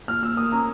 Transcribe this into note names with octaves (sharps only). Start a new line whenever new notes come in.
A#2 F6
A#2 E6
A#3 D#6
C#4 A#5